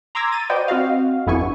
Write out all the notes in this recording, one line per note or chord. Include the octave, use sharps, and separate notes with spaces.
A#5 C6 D6 E6 G#6 A#6
A6 D#7
F#4 B4 C5 D5 D#5 G5
C4 F#4 D#5 F5
G1 F2 B3 E4 G#5 C#6
G2